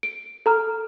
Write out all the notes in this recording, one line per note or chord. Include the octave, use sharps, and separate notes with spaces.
D7
A4 A#5 F6